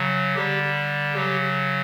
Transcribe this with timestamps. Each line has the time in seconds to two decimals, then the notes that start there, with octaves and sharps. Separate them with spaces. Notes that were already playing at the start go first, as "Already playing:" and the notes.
Already playing: C#3 F#3
0.36 D3 G3 G4
1.14 C#3 F#3 G4